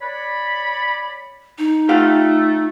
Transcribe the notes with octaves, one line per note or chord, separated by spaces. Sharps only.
C#5 D5 B5
D#4
A3 F4 G4 F5